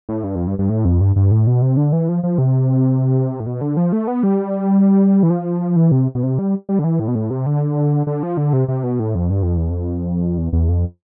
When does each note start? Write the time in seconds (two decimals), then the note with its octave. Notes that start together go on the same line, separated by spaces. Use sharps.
0.09 A2
0.24 G2
0.35 F2
0.47 G2
0.59 G2
0.69 A2
0.85 F2
1.01 G2
1.16 G2
1.31 A2
1.47 B2
1.62 C3
1.77 D3
1.93 E3
2.09 F3
2.23 F3
2.38 C3
3.40 A2
3.46 B2
3.61 D3
3.77 F3
3.93 A3
4.07 B3
4.23 G3
5.23 E3
5.30 F3
5.76 E3
5.92 C3
6.15 B2
6.23 C3
6.39 G3
6.69 G3
6.79 D3
6.84 E3
7.00 A2
7.08 B2
7.15 A2
7.30 C3
7.46 D3
8.07 D3
8.23 F3
8.37 D3
8.53 C3
8.68 C3
8.83 B2
9.00 A2
9.15 F2
9.30 G2
9.43 F2
9.57 E2
9.70 F2
10.38 E2
10.53 E2
10.69 F2